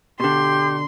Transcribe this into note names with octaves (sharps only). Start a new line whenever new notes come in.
B2 D3 G4 C6